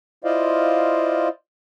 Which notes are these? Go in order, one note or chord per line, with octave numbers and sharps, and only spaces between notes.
E4 F4 C5 D5 D#5 F5